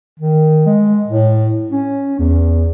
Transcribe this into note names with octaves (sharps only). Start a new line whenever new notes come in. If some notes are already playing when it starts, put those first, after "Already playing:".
D#3
G#3
A2
C#4
E2